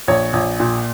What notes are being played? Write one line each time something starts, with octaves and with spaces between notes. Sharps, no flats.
A#1 C#5
A#1
A#2